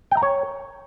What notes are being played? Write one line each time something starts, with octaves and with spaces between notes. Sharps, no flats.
G5
A#5
C#5